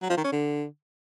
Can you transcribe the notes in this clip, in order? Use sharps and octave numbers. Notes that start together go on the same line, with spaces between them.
F#3
F3
D#3
C#4
D3